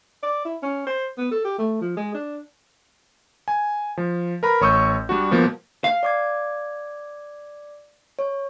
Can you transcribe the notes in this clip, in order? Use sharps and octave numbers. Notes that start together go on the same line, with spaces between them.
D5
E4
C#4
C5
B3
A4
G4
A3
F3
G#3
D4
G#5
F3
A#4 B4 A#5 B5
A1 C#5 C#6 D#6 E6 G6
G3 D4 F#4
B2 F3 G3 A#3 B3
F5
D5 D6 G#6
C#5